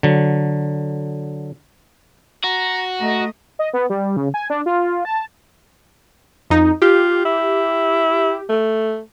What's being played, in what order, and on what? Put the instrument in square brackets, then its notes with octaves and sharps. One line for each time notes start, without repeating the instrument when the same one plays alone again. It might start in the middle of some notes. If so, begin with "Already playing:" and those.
[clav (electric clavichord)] D3 F#3
[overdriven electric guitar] F#4 [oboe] A#5
[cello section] A3 D#5 [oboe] A#5
[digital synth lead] D#5
B3
G3
C#3
G#5
D4
F4
A5
[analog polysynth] F2 D#4
[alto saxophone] F4 [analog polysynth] G4
[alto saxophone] E4
A3